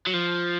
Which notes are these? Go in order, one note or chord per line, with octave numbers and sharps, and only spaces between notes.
F#3
F3